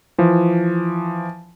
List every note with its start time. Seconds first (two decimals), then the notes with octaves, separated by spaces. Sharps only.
0.18 E3 F3